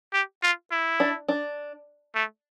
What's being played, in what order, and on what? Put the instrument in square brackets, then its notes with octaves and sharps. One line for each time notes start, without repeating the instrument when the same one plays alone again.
[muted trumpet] G4
F4
E4
[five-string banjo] D4
D4
[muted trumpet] A3